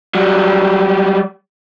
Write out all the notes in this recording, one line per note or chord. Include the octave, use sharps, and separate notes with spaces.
F#3 G3